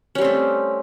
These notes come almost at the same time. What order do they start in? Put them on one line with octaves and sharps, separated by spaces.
C#4 G3 C4 A3